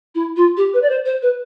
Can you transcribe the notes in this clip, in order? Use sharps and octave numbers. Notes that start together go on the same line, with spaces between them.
E4
F4
G4
B4
D5
C5
C5
B4